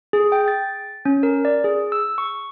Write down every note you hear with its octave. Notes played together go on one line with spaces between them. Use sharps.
G#4
G5
A6
C#4
A#4
D5
G#4
E6
C#6